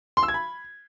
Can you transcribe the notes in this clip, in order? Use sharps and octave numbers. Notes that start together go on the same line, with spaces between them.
C6
E6
G#6
B5